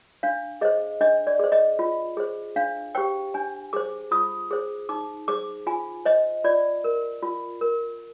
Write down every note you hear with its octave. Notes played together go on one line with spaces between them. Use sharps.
D4 F5
G#4 C5 D#5
D4 D#5
D5
G#4 C5
D#5
F4
G#4 C5
D4 F5
G4 C5 G5
D4 G#5
G#4 C5 D6
F4 D#6
G#4 C5
D#4 D6
G#4 C5 D6
F4 G#5
C5 D#5
F4 D5
A#4
F4
A#4